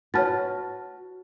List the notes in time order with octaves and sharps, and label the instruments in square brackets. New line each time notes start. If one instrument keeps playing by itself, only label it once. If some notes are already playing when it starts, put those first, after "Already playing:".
[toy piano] F4 B4 A5 [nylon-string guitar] F#4 [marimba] C#5 F6 A6